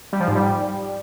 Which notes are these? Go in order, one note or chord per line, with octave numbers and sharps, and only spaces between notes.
G3
F3
G#2
G3